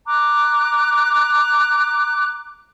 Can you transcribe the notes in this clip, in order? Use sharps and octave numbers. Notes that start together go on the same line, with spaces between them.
A#5 D6 F#6